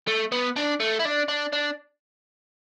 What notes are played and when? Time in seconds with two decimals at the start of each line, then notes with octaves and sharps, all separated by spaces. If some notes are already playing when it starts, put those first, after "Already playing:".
0.08 A3
0.32 B3
0.56 D4
0.80 A3
0.99 E4
1.05 D4
1.28 D4
1.53 D4